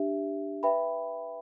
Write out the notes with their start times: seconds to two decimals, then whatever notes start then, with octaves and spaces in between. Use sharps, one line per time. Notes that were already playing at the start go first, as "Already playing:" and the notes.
Already playing: D4 G4 E5
0.63 B4 E5 G5 B5